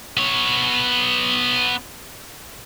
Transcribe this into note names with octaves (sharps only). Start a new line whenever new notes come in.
B3 C#5